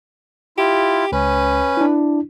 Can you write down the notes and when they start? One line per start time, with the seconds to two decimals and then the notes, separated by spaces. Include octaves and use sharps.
0.58 E4 F4 G4
1.12 C#2 C#4 B4
1.77 D4 E4